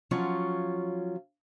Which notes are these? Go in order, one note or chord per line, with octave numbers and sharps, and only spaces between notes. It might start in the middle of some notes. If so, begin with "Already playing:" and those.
F3 F#3 C#4 F4